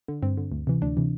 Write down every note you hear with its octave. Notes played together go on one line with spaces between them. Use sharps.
D3
G2 C4
D3
D2
C3 E3
D2 D4
C3 E3